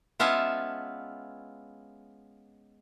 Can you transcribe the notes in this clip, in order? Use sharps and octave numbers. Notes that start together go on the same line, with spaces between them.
G#3 B3 C#4 F4 E5 A5